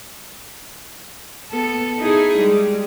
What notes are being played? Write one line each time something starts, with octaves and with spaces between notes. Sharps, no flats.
B3 A4
D#4 E4 G#4
G3 G#3